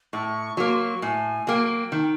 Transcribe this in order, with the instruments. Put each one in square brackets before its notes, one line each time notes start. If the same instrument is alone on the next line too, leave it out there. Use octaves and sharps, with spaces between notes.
[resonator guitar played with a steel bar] A2 [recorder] C#6
[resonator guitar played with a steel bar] F#3 A#3 [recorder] C#6
[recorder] C6
C#6
[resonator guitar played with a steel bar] A2 [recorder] G#5
[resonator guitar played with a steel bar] F#3 A#3 [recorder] G5
[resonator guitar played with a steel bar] D#3